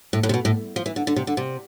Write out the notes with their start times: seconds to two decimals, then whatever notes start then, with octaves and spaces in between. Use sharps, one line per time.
0.13 A2
0.23 A2
0.29 C3
0.34 B2
0.45 A2
0.76 F3
0.86 E3
0.96 D3
1.07 D3
1.16 C3
1.27 D3
1.37 C3